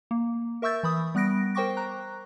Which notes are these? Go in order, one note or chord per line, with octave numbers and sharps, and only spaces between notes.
A#3
A#4 E5 C#6 E6 G6 A6
E3 B5 D#6
G3 B3 F#6 A#6 D7
A#4 C5 G5 C#6 D6 A#6
A#5 F#6